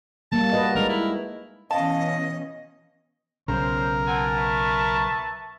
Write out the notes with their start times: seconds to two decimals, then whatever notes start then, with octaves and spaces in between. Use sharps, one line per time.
0.32 G3 A#3 A5
0.53 F#4 B4 D#5
0.75 G#3 D#4 A#4 B4
0.89 E4
1.71 B2 E3 C#4 D#5 F5 A5
3.48 B1 C#3 A#4 C5
4.07 C4 F#5 G#5 A5
4.37 B4 E5 C#6